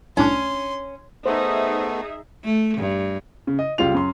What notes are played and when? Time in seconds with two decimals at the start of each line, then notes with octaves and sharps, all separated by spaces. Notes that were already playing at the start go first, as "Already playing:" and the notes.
0.17 C2 A2 C#4 D4 C6
1.26 A3 B3 D#4 G#4 C5 E5
2.44 A3
2.78 G2
3.47 C#3
3.59 D#5
3.78 C#2 G3 F4 F7
3.94 F#2 C6